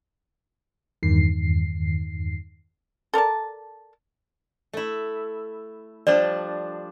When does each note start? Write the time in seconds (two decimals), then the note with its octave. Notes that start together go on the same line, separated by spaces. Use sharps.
1.03 E2 G2 D#3 C7
3.14 A4 A#4 D5 A5
4.73 A3 E4
6.07 F3 G3 D4 D5